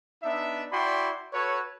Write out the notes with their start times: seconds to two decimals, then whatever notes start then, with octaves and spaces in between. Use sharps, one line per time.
0.23 B3 D4 D#4 E5
0.72 E4 F#4 D5 G5 B5 C6
1.33 F#4 A4 B4 C#5